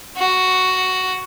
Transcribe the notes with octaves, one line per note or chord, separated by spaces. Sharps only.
F#4